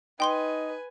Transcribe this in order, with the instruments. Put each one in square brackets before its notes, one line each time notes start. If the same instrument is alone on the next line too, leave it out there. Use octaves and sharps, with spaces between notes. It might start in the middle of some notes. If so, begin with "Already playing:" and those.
[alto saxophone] D#4 [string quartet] B4 G#5 [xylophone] G5 C6 G7